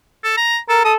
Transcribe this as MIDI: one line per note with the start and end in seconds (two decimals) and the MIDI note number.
0.24 0.37 69
0.37 0.58 82
0.69 0.81 69
0.69 0.80 70
0.85 0.97 69
0.85 0.93 87